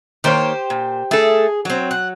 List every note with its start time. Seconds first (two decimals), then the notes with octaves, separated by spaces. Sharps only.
0.24 D#3 A#3 G4 C5 C#5
0.70 A#2
1.11 A3 G#4 A4
1.65 F#3 C4 C#5
1.91 F#5